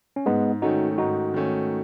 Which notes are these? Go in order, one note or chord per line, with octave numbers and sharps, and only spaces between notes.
C#4
G#2 G#3 B3
D#3 A3 C#4 D#4 F#4
G#2 D#4 F#4
D#3 A3 C#4